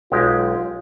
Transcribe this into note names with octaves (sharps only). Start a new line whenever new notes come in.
B1 G#3 F4 G4